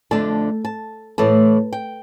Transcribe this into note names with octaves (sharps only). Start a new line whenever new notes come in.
F2 D3 A3 D4 A5
A5
A2 E3 A3 A5
G5